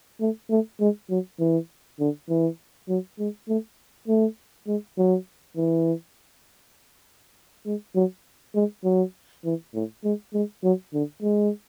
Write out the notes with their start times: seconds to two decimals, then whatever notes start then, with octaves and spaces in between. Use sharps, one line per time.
0.21 A3
0.50 A3
0.80 G#3
1.10 F#3
1.40 E3
2.00 D3
2.29 E3
2.89 F#3
3.19 G#3
3.48 A3
4.08 A3
4.67 G#3
4.98 F#3
5.57 E3
7.66 G#3
7.95 F#3
8.55 G#3
8.84 F#3
9.45 E3
9.74 A2
10.04 G#3
10.34 G#3
10.63 F#3
10.94 D3
11.23 G#3